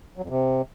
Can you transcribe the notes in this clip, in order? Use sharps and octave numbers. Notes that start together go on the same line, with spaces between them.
F#3
F2
C3